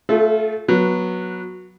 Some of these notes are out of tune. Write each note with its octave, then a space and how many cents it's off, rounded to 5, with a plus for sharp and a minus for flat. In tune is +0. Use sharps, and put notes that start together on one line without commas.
A3 +0 F4 +0 A4 -35
F#3 -10 B3 -25